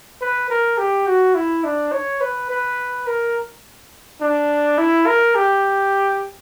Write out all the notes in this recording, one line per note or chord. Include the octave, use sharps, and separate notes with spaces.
B4
A#4
G4
F#4
E4
D4
C#5
B4
B4
A#4
D4
E4
A#4
G4